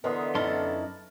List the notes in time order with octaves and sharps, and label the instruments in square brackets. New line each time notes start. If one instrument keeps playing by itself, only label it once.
[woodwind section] D3 E3 B3 [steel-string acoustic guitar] A#4 B4 [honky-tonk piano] D#5 C6 D#6
[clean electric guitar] F#2 C#4 C6 [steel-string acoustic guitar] D#4 E4 [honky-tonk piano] A5 F6 A6